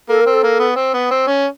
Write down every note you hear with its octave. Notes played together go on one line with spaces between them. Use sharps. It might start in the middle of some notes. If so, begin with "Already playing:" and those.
A#3 A4
C4 A#4
A4
A#3
B3
C4
B3
C4
C#4